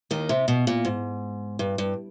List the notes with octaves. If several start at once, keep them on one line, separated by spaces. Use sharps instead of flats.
D#2 D#3
C3
B2
A#2
G#2
G2
G2